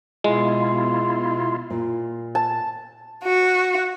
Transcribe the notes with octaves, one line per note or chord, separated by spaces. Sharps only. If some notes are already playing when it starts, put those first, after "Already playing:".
B2 G#3 E4 F4 C6
A#2
A5
F#4